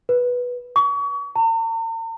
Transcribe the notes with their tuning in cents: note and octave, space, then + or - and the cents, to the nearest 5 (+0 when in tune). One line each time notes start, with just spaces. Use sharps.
B4 -5
C#6 +35
A#5 -45